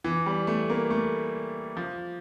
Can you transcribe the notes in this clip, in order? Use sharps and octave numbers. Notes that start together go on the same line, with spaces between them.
E3
G3
A3
A#3
A3
F3